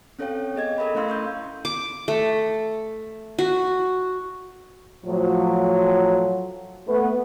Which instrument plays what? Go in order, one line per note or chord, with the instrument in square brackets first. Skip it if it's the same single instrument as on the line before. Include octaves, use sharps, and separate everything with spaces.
[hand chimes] C4 C#4 A4 C#5 F5 G5
B3 G#4 D#5 G#6
A4 A#4 E5 B5
A3 C#4 E4 F5 C6 E6
C#6 D#6 G6
[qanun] D6
A3
F#4
[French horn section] A2 F3 F#3
A3 B3